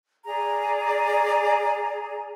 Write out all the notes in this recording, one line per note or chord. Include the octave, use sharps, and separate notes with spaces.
G#4 D5 A#5